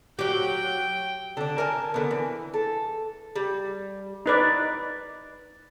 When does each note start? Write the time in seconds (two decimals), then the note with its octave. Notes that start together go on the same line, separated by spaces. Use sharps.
0.19 F#3 G4 G5
1.37 D3 D4
1.58 A#4 G#5 A5
1.94 D3 B3
2.11 E3
2.54 A4
3.36 G3
4.26 D#4 B4 D5